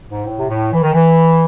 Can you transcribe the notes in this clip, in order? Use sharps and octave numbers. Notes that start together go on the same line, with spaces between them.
G#2
A2
C3
A2
E3
D#3
E3